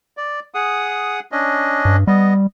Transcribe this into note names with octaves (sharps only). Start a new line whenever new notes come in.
D5
G#4 F#5 D#6
C#4 D4 D#5
G2
G3 B3 D#5